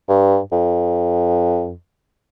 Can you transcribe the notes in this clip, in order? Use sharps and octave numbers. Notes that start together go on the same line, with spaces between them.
G2
F2